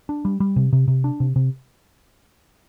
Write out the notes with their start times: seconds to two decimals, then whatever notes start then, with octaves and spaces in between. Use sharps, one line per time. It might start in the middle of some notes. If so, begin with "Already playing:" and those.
0.09 D4
0.25 G3
0.40 G3
0.56 C3
0.73 C3
0.88 C3
1.04 D4
1.20 C3
1.36 C3